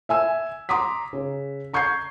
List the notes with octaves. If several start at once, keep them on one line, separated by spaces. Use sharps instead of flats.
E5 G#5 E6
A#5 C6 D6 D#6 B6
C#3
A#5 C#6 G6 G#6 C7